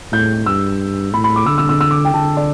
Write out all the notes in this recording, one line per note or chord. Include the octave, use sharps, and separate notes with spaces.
A2 G6
G2 E6
A2 B5
B5
D6
D3 E6
E6
E6
E6
D6
G5
D3 A5
D5